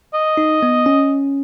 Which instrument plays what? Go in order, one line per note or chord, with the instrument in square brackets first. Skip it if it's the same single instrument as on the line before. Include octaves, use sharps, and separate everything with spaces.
[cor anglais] D#5
[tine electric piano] D#4
B3
C#4